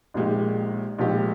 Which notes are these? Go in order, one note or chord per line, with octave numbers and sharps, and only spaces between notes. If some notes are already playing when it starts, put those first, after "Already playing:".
A#1 A#2 G#3 D#4 G4
A#1 A#2 G#3 D#4 G4